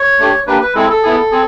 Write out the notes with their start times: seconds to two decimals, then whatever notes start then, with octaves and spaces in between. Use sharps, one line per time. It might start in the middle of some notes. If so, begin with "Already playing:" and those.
Already playing: C#5
0.19 A3 D4 G4
0.47 A#3 D4 G4 B4
0.61 B4
0.75 G#3 C4 E4 G#4 A4
0.90 A4
1.03 B3 E4 G#4
1.31 C4 G#4